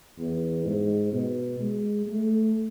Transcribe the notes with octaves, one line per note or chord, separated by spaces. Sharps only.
E2
G#2
B2
G#3
A3